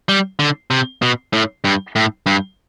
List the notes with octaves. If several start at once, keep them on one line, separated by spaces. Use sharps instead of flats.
G3
D3
C3
B2
A2
G2
A2
G2